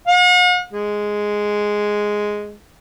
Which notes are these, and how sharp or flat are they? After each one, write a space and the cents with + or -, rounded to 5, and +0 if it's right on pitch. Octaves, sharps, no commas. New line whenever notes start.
F#5 -45
G#3 +0